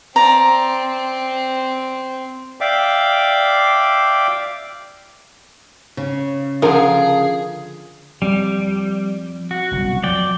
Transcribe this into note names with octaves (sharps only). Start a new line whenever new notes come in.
C4 D5 A#5
D5 E5 F5 G5 D6
C#3
D3 F3 F4 G#4 A#4
F3 G3 C4
F#4
F#1 C2 B2
F3 F#3 D5 G5